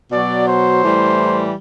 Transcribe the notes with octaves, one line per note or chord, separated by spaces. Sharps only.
B2 F#3 D5
C5
A2 E3 G3